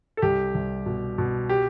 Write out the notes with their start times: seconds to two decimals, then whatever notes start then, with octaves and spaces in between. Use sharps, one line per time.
0.17 A4
0.22 C2 G4
0.55 C2
0.86 B2
1.18 B2
1.49 G4